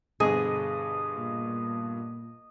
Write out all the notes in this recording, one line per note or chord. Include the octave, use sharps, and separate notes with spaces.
G2 B2 D3 G#4 D#5
A#2